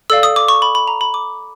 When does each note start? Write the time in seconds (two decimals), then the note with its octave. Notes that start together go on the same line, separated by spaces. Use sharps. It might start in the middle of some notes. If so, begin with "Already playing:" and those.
0.10 A4 D5 F5 E6
0.23 D#6
0.36 D6
0.48 C#6
0.62 B5
0.75 B5
0.88 A#5
1.01 B5
1.14 D6